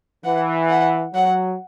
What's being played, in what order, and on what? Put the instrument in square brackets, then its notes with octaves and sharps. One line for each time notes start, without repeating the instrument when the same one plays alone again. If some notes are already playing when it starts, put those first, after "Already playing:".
[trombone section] E3 [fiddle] F#5
[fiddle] F#5
[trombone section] F#3 [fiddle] F#5